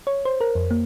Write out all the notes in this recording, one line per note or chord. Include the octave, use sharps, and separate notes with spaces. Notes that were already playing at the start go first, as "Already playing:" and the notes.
C#5
C5
A#4
F2
A#3